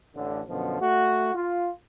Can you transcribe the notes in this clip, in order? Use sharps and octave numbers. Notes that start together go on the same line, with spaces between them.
A1 D3
F#2 B2 D3 F3
A3 F#4
F4